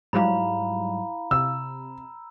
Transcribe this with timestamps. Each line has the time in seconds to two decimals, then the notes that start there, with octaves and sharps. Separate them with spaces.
0.13 G#2 F#3 G3 E4 F5 A#5 B5
1.31 C3 E6